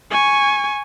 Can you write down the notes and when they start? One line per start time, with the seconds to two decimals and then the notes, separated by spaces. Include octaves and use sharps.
0.11 G#5 C#6